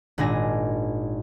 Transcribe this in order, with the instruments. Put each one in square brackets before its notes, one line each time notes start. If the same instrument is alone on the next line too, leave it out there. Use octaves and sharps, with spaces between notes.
[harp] G#1 A#2 D4 G#5 A#6